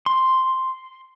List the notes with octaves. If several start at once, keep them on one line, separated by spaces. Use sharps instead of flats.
C6